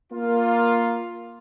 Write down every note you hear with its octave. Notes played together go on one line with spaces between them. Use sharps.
A#3 F4